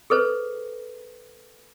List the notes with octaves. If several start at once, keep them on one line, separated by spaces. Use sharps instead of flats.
G#4 A4 B4 C5